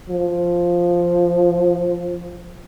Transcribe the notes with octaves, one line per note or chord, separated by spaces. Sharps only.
F3